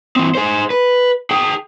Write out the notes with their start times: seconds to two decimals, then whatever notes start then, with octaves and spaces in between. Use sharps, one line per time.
0.16 E3 C4
0.35 G#4 C5
0.70 B4
1.31 G#4 G5